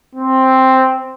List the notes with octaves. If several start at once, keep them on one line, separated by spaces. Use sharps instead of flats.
C4